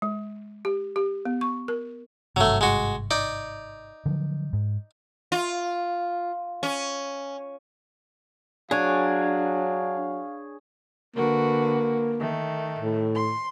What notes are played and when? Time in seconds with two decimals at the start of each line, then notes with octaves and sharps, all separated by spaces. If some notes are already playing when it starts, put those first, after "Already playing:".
0.02 G#3
0.65 G4
0.96 G4
1.25 B3
1.41 C#6
1.68 A#4
2.36 G#1 G2 C3 F#3 A3
2.61 G#3 F#4
3.11 D#4 D5
4.06 D3 F3 F#3
4.53 G#2
5.32 F4
6.63 C#4
8.71 F#3 D4 G#4 C#5 F5 G#5
11.17 D3 A#3 F#4 B4
12.19 D#3 A3
12.79 A2
13.14 C6